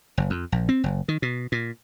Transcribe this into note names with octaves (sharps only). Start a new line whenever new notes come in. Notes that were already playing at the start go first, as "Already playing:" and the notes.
F#1
F2
A#1
C4
F#1
D#3
B2
A#2